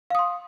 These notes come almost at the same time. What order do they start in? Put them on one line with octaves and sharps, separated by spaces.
F5 D#6 C6